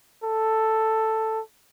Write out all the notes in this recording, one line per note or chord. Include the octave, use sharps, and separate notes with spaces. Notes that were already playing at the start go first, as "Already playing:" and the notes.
A4